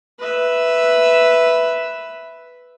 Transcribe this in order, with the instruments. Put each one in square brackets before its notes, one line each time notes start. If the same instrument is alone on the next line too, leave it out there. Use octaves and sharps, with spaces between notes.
[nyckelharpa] B4 E5